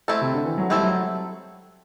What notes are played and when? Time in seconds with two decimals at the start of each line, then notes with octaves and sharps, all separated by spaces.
0.08 A3 C4 E4 A4
0.21 C3
0.33 D3
0.45 E3
0.58 F#3
0.70 G3 A3 C4 E4 A4
0.85 F#3